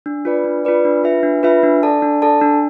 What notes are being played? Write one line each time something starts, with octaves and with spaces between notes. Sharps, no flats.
D4
F4 B4 D5
D4
F4 B4 D5
D4
F4 B4 E5
D4
F4 B4 E5
D4
A4 D5 A5
D4
A4 D5 A5
D4